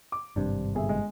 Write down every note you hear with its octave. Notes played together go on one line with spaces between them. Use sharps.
D6
G#1 G2 C3 D4
G1 G#4 E5
G#3